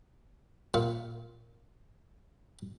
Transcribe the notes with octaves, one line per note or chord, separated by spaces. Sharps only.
A#2 F5